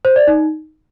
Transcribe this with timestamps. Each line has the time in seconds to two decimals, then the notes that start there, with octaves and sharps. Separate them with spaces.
0.05 C5
0.16 D5
0.27 D#4